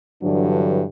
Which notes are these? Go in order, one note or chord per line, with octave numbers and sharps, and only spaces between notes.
G2 D3 E3 F#3 D4